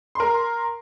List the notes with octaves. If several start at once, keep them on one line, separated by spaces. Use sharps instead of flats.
A#4 C6